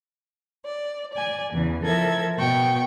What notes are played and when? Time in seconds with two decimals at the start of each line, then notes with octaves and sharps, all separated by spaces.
0.65 D5
1.13 D5 G#5
1.52 E2 C#3 E3
1.84 F3 A4 A#4 E5 G#6
2.38 B2 G5 C#6